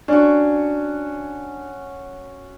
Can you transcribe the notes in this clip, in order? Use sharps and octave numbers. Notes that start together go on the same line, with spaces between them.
C#4 D4 F#4